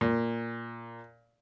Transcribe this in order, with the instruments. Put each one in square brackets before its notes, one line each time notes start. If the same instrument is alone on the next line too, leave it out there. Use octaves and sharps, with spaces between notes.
[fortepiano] A#2